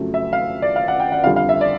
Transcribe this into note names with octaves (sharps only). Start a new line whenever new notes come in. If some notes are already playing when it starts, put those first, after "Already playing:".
Already playing: F2 C#3 F#3 A3
E5
F5
D5
F5
F#5
G5
F#5
F2 D3 G3 F5
F5
E5
D5